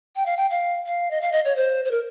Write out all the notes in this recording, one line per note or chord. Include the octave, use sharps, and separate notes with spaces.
G5
F5
G5
F5
F5
D#5
F5
D#5
C#5
C5
C5
A#4